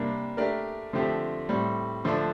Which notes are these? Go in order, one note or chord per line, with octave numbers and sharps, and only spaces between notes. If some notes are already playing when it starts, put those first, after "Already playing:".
Already playing: C3 G3 A#3 D4
A3 D4 G4 A#4 D5
D3 F3 A3 C4 G4
A2 G3 C4
D3 F3 A3 D4